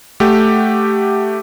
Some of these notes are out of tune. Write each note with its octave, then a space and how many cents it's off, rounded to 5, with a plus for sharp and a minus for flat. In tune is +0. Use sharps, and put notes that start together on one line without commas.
A3 +0 G4 +0 F#5 +0